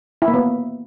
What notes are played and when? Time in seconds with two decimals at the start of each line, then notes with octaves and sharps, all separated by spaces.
0.22 E4
0.28 A#3
0.34 B3